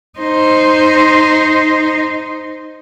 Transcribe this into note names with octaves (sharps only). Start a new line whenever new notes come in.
D#4 C5